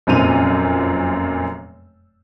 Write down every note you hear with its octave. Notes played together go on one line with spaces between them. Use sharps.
F1 F#2 A#2 C4 D#7 F7